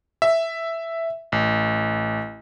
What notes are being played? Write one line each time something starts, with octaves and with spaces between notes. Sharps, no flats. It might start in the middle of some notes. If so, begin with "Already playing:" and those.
E5
A1